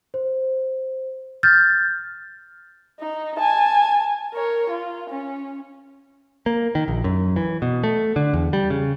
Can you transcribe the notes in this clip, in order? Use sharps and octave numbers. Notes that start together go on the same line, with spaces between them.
C5
F6 G6 A6
D#4
G#5 A5
A#4 C#5
F4
C#4
A#3
D#3
A#1
F#2
E3
B2
A3
D3
E2
G3
C#3